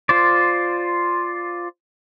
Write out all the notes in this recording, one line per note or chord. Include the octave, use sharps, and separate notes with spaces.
F4 C5 D5